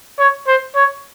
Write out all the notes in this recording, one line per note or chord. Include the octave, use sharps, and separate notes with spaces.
C#5
C5
C#5